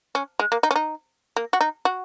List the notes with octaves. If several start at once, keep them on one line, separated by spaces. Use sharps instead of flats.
C#4
G#3
A#3
D#4
C#4
D#4
A#3
F#4
D#4
F#4